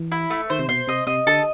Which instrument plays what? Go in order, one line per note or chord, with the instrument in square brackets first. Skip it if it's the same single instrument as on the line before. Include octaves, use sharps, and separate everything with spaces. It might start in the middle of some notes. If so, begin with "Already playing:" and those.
Already playing: [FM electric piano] E3
[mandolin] E4
A3
[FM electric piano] D#3 [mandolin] C5
[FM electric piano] C3
[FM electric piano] B2 [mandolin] C5
[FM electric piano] C3 [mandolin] D#5
[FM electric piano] C3 [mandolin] D#5
[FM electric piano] D3 [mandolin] A4